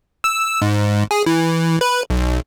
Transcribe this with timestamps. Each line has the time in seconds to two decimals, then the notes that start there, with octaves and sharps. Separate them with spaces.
0.24 E6
0.62 G#2
1.11 G#4
1.26 E3
1.81 B4
2.10 B1